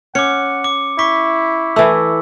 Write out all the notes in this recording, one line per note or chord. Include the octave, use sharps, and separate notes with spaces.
C#4 F#5 D6 C#7
D6
E4 C#6 D6 B6
E3 A3 E6